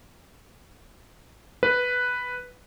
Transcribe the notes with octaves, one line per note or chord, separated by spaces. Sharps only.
B4